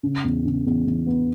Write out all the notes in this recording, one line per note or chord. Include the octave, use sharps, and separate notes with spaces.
C#3
E2
C#3
E2
E2
B3